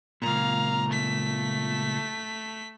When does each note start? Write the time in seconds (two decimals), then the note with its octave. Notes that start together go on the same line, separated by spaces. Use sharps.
0.22 C#2 F#2 A#2 F5 A#5
0.88 A3 B6